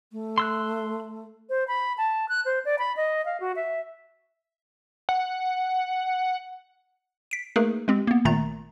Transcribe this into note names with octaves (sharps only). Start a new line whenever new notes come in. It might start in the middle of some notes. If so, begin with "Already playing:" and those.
A3
C6 E6 F#6
C5
B5
A5
F#6
C5
D5
B5
D#5
F5
F#4
E5
F#5
B6 D7
A3 A#3 D#4 G#4 A#4 B4
G#3 C4 G4
A#3 B3
G#1 A#2 D#3 A3 A#5 A6